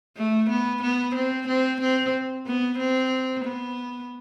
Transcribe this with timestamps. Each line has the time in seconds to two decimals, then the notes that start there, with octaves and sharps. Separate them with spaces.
0.17 A3
0.50 B3
0.83 B3
1.15 C4
1.48 C4
1.81 C4
2.46 B3
2.79 C4
3.44 B3